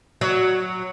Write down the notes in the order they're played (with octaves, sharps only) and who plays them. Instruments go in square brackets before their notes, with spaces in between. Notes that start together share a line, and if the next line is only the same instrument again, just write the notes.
[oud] F#3